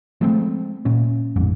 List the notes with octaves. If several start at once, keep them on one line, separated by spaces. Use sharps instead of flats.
F3 G#3 A3 C4
A#2 C#4
A1 F2 G#2